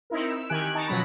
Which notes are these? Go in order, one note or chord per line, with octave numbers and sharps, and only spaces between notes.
C4 D#4 E4 A#4
E6
D#3 G4 G#5 F#6 D7
D#4 A5 A#5 C#6
B2 F3 F#3 C#4 B5 A#6